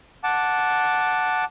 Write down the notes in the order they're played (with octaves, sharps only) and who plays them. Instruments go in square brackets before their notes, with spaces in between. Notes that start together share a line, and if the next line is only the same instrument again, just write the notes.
[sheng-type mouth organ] F#5 A5 D6